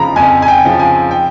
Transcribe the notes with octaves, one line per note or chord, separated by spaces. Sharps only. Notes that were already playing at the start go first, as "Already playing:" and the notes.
Already playing: F2 C#3 F3 A#5 B5
F2 G#5
G#5
G5
C#3 F3
G#5
G5